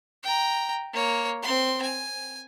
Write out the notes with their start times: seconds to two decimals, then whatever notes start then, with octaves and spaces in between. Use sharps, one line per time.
0.23 G5 A#5
0.93 A#3 C#5
1.42 C4 C6
1.82 G#5